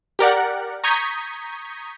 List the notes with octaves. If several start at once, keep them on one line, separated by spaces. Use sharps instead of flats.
G4 A#4 D5 F#5
A#5 C#6 D#6 G6 G#6 B6